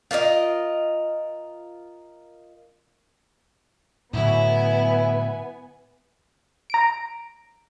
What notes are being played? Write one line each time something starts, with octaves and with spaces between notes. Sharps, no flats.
F4 A#4 C#5 D#5
A2 D3 F#3 B3 E4 G#5
A#5 D7